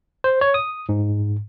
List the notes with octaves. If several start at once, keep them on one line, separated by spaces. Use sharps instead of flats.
C5
C#5
D#6
G#2